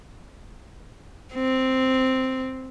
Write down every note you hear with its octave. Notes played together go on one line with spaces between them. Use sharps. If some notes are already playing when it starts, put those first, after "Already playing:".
C4